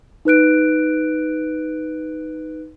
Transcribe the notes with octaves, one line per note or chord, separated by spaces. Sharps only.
D#4 B4 F#6 D7